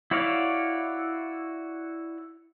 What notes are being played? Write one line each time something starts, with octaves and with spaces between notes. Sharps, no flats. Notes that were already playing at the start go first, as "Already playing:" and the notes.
E4 F#4 C#5 D5 F5